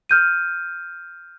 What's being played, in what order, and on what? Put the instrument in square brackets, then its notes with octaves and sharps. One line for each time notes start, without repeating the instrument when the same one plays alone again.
[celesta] F6 G6 D#7